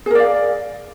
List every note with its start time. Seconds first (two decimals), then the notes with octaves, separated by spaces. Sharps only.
0.06 G#4
0.11 A#4
0.15 D5
0.20 F5